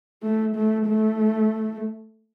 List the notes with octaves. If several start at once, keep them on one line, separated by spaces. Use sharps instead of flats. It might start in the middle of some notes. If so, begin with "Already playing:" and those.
A3
A3
A3